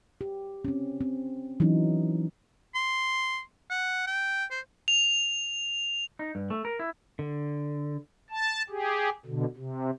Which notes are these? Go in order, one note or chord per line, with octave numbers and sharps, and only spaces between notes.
G4
C4 C#4
C4
E3 F#3 C#4 D#4
C6
F#5
G5
C5
F7
D#4
G2
A3
A#4
E4
D3
A5
G4 G#4
B2 D3
C3